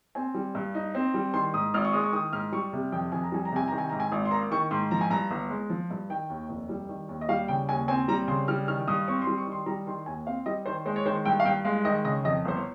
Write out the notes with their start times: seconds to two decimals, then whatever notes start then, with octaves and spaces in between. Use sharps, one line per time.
0.15 C4 G#5
0.34 G3
0.55 G2
0.75 D#4
0.95 C4
1.14 G3
1.34 D#3 C6
1.54 G#2 D#6
1.74 G#1 F6
1.85 C#6
1.93 G#3 D#6
2.04 C#6
2.13 D#3 D#6
2.33 G#2 F6
2.52 G3 C#6
2.73 C3
2.92 F2 G5
3.12 F2 G#5
3.23 A#5
3.32 G3 G#5
3.45 A#5
3.52 C3 G#5
3.68 D#3 A#5
3.78 G#5
3.89 G#2 A#5
4.00 G#5
4.12 G#1
4.25 C6
4.31 A#3 A#5
4.51 D#3 C#6
4.71 G#2 C6
4.91 F3 A#5
5.01 G#5
5.10 G2 A#5
5.31 G1
5.50 G#3
5.70 F3
5.91 G2
6.10 D#3 G5
6.30 D#2
6.49 F1
6.69 G3
6.89 D#3
7.09 D#2
7.21 D#5
7.29 G3 F5
7.48 C#3 G5
7.68 D#2 G#5
7.88 C4 G#5
8.08 G3 A#5
8.28 C#3 C6
8.48 G3 F6
8.68 D#3 F6
8.88 G2 D#6
9.08 C4 C#6
9.22 C6
9.27 G3
9.38 C#6
9.47 D#3
9.52 C6
9.66 G3 A#5
9.87 D#3 C6
10.06 D#2 G#5
10.26 C4 F5
10.46 G3 D#5
10.66 D#3 C5
10.86 G#3 C5
10.96 C#5
11.05 D#3 C5
11.25 G2 G5
11.40 F5
11.45 G2 G5
11.65 G#3 F5
11.85 D#3 D#5
12.05 C#3 D#5
12.25 F2 D#5
12.45 G1 C5
12.56 C#5